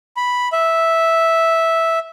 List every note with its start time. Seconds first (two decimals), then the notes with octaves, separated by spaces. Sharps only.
0.17 B5
0.52 E5